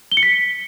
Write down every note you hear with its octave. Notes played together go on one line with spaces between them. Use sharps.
G7
C#7
B6